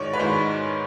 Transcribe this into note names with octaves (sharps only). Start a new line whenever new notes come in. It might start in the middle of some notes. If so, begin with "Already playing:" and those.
Already playing: G#2 D#3 G#3 C#5 D5
B4
G#2 D#3 G#3 C5